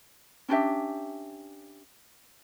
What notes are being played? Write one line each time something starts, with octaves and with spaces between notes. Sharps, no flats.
C#4 D4 G4 E5